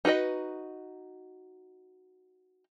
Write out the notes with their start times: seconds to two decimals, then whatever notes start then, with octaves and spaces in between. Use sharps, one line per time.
0.05 D#4 F#4 B4 D#5